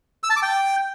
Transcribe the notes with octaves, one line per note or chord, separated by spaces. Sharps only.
E6
A5
D6
G5